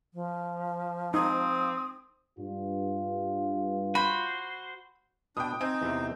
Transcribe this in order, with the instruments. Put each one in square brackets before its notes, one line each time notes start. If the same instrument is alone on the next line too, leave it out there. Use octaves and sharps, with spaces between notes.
[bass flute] F3
[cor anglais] C4 [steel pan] D#4 [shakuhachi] D#6
[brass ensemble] G2 [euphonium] F4
[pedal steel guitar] F#4 C5 [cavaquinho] B5
[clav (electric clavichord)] B2 [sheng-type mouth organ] D4 [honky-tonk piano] G5 D#6
[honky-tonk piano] C4 [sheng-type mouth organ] D#4 [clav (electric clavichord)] G#5
[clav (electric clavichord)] E2 C3